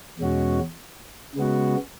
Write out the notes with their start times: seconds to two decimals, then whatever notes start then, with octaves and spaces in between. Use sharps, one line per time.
0.19 E2 B2 G#3 C#4 F#4
1.35 C#3 G#3 B3 F#4